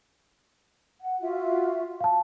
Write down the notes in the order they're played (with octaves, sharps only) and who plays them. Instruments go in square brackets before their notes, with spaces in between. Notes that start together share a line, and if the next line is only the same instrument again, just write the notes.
[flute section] F#5
F4 F#4 E5
[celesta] F5 A5